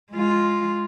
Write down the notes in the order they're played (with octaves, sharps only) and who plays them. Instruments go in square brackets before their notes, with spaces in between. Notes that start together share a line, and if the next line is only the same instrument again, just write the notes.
[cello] G#3 F4